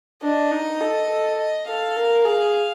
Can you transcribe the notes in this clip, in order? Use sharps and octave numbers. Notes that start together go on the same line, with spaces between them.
D4 D#5
D#4
A4
A4
D#5
A4 F5
A#4
G#4 F5